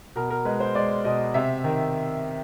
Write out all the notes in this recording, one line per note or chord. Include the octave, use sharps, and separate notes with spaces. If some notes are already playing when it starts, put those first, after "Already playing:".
B2 A#4
A#4
G#3 B4
C5
G#3 D5
B2 D#5
C3 E5
D#3